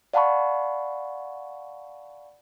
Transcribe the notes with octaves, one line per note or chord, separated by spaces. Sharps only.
D5 F5 F#5 A5 B5 C#6